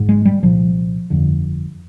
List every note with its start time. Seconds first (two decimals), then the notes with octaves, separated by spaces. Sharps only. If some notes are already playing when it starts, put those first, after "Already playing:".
Already playing: G#1 G#2
0.09 G#3
0.25 G3
0.42 C2 A#2 F3
1.10 G1 F2 D3